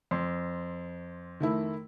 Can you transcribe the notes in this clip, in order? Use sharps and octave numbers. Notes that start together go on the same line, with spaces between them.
F2 C6
D#3 A3 E4